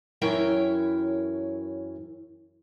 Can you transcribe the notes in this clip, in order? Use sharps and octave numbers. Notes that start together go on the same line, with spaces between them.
F#2 E3 E4 A#4 C#5 G5